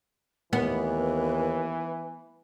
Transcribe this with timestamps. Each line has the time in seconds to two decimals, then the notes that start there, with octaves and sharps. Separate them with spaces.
0.53 D#2 E3 B3 B4